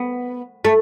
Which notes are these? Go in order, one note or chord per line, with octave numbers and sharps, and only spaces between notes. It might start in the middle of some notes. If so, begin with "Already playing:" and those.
Already playing: B3
A3